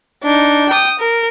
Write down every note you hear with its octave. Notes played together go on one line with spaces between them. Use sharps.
D4 D#4
G5 D#6
A#4